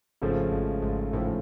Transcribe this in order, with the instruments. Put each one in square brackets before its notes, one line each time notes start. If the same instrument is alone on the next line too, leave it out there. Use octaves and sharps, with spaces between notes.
[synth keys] G#1 G#2 [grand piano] C#3 F3 A3
[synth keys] G#1 G#2
G#1 G#2
[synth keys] A1 A2 [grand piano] C#3 F3 A3